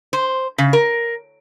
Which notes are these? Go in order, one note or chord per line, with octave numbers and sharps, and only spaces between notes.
C5
C#3
A#4